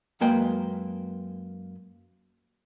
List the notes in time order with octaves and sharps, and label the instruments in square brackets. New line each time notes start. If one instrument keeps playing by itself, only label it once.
[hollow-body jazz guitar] F#2 G#3 A#3 B4 G5